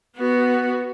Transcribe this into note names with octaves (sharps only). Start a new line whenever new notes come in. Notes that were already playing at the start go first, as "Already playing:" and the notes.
B3 F#4